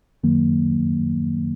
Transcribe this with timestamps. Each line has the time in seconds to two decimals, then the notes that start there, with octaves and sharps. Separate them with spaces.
0.23 F#2 D#3 F#3 A#3